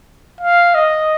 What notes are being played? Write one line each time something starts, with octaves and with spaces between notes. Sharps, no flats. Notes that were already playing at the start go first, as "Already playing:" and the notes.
F5
D#5